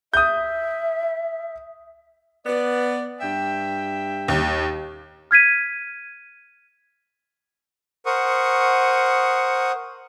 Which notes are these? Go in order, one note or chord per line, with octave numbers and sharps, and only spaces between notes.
E5 D#6 G6
B3 D5
G2 E5 G5
D#2
F6 G#6 B6 D#7
A#4 C5 F#5 C#6 D#6